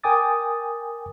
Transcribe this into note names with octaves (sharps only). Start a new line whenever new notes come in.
A#4 G5 G#5 D6 D#6 A6